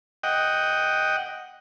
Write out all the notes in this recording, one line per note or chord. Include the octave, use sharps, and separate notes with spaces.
D#5 F#5 G5